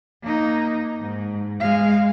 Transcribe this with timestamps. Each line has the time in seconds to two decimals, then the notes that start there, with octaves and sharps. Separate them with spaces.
0.23 A#3 D#4
1.01 G#2
1.60 G#3 F5